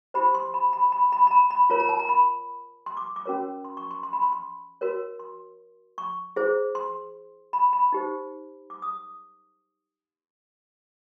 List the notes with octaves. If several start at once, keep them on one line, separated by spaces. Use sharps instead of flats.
E4 G4 C5 B5
C6
B5
B5
B5
B5
B5
A#5
B5
F4 A#4 C#5 A#5
A#5
A5
A#5
B5
C6
D6
D6
C#4 F#4 A#4 C#5
C6
C#6
C6
C6
B5
C6
C6
F#4 A#4 C#5
C6
C#6
E4 G#4 C5
C6
B5
B5
D#4 G4 C5
D6
D#6